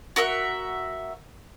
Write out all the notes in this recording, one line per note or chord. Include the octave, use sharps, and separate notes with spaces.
F#4 A#4 E5 F#5